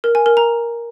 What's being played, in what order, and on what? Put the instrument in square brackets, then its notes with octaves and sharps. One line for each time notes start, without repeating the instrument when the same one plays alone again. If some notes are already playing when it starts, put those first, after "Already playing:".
[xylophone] A#4
G#5
A#4
A#5